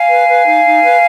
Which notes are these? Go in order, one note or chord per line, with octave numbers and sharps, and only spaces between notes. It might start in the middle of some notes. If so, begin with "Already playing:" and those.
Already playing: F5 G#5
B4
B4
D#4
D#4
B4